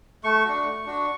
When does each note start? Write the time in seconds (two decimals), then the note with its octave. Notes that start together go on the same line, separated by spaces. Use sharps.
0.24 A3 C#6
0.45 D4 F#4
0.65 A3
0.85 D4 F#4